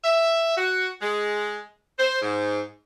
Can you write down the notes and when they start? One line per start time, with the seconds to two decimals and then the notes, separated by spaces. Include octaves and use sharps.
0.04 E5
0.57 F#4
1.01 G#3
1.98 C5
2.21 G#2